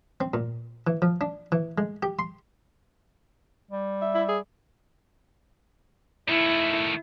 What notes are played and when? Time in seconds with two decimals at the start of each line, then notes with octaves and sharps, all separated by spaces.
0.21 C4
0.34 A#2
0.87 E3
1.02 F3
1.21 D4
1.52 E3
1.78 G#3
2.03 G4
2.19 C6
3.71 G3
4.02 E5
4.15 E4
4.29 G#4
6.29 D#3 A3 E4